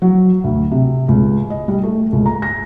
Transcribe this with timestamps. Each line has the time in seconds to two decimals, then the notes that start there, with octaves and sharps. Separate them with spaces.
0.02 F#3
0.44 D2
0.71 C3
1.08 C#2
1.50 D#5
1.68 G3
1.83 A3
2.13 C#2
2.26 A#5
2.42 A#6